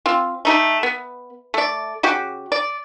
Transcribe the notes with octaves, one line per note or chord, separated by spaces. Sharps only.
C4 F4
A3 D#4 G4
B3
A3 D5
C#3 F#4 G4
D5